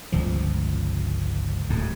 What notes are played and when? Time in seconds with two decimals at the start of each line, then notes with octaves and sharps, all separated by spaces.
0.12 G1 C#2 F3
1.70 D1 G#2